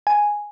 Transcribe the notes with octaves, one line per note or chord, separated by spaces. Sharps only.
G#5